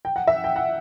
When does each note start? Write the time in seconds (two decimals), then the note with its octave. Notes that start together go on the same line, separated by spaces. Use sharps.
0.05 G5
0.16 F#5
0.27 E5
0.44 G5
0.56 F#5